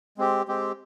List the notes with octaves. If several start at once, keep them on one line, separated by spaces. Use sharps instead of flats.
G#3 C4 G4
G#3 C4 G4